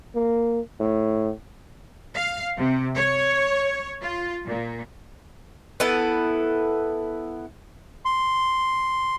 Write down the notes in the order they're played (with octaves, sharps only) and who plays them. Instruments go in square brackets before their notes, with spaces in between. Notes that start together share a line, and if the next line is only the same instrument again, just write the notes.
[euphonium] A#3
A2
[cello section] F5
C3
C#5
F4
A#2
[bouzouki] B3 E4 A4
[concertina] C6